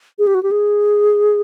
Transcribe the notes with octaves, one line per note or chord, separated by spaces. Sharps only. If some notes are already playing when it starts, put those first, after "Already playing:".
G#4
G4
F#4
G4
G#4